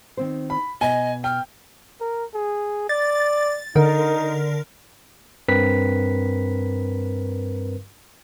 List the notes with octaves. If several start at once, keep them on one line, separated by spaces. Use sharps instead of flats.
D#3 C4 C5
B5
B2 D#5 G#5
G5 F6
A#4
G#4
D5 A6
D3 D#4 A#4
G2 C4 A#4 B4 B6